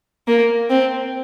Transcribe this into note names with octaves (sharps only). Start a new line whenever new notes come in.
A#3
C4